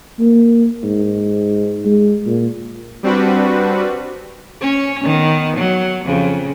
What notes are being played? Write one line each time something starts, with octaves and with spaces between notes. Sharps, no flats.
A#3
G#2
G#3
A#2
G3 C4 D4 F#4 B4
C#4 C#5
D#3 B3
F#3
F2 C#3